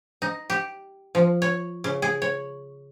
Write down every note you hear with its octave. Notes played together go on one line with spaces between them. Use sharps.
D#4
G4
F3
C#5
C#3
G#4
C#5